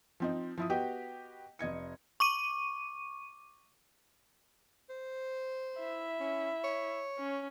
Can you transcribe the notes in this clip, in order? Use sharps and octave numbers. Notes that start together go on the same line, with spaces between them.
F3 C4 D#4
F3 E4 D#6
B3 F#4 G4 D#5 G5
F1 D#5 G#6 C#7
C#6 D6 D#7
C5
E4 E5
C#4
C#5
C#4